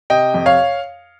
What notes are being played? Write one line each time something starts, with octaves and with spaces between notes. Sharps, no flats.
C3 D#5 G5
F2
C#5 F5